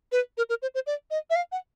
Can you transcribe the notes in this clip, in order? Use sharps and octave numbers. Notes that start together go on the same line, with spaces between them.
B4
A#4
A#4
C5
C5
D5
D#5
E5
F5
F#5